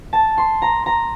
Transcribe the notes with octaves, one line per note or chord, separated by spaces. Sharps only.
A5
C6
A#5
A#5